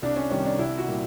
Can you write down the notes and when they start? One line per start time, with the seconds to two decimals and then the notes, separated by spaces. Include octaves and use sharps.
0.02 C2 D4
0.16 C#4
0.30 C3 D#3 G3 C#4
0.46 D4
0.59 C2 E4
0.78 F#4
0.88 A#2 G3